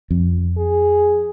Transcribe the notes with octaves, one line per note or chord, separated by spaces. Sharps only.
F2
G#4